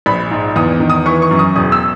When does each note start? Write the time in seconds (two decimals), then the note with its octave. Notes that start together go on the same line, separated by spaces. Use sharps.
0.06 A#1 B5
0.31 G#2
0.56 E2 D#6
0.80 D#3
0.90 D#6
1.06 E3 C#6
1.22 C#6
1.31 F#2
1.39 D#6
1.55 E1 D#6
1.72 E6